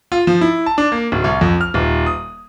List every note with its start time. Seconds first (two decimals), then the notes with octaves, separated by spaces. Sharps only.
0.12 F4
0.27 F3
0.41 E4
0.66 A5
0.78 D4
0.92 A#3
1.12 D1
1.24 C2
1.41 F2
1.61 F6
1.74 D#1
2.06 D#6